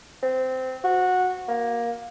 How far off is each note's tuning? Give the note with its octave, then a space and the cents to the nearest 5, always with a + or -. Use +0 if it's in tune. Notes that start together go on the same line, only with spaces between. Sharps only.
C4 -15
F#4 -15
A#3 +10